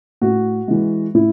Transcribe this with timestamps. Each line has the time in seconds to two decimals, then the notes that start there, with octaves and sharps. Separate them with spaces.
0.21 A2 F#4
0.68 E3 G#3
1.14 A2 E4